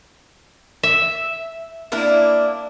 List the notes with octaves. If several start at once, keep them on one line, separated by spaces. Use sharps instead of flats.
E5
A#3 D4 E4